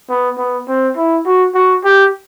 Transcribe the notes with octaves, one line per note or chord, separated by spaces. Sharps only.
B3
B3
C4
E4
F#4
F#4
G4